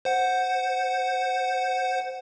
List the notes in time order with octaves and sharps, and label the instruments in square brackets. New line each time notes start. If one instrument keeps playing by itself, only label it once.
[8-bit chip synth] C5 F#5